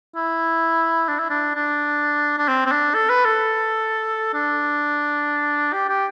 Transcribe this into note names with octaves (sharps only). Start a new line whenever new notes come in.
E4
D4
E4
D4
D4
D4
C4
C4
D4
A4
B4
A4
D4
G4
G4